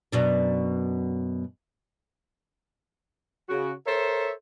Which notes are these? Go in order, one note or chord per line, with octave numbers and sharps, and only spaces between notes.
F#2 B2 D4
C#3 F#4
A4 A#4 C5 C#5 E5